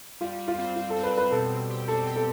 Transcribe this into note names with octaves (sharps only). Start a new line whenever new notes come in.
G3 F4
G3
F4
C4
C4 F4
A4
C4
B4
C4 B4
B2 A4
B2
G4
C4 A4
G4
A4